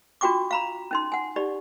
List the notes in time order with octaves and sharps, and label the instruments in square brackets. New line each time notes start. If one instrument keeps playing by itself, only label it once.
[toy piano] D4 F4 F#4 G5 C#6 D6
F5 A#5 B5
C#4 D#4 C6
F#5 G#5
D#4 G4 D5